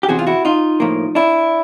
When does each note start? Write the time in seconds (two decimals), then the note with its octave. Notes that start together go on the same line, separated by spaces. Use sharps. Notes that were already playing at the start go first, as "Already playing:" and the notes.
0.03 G4
0.08 E2 C3 E3 F#4 G#4
0.19 F4
0.27 E4 F#4
0.45 D#4 F4
0.80 A2 F3 A#3
1.15 D4 E4